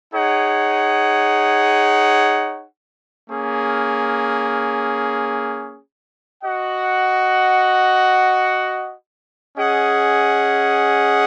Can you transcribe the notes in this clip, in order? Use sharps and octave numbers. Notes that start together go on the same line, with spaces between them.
D#4 G#4 C#5 F#5
A#3 C#4 G#4
F#4 D#5 F#5
C#4 G#4 D#5 F#5